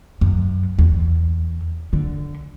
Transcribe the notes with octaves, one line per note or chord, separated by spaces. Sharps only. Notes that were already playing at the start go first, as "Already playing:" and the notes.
F#2
E2
D3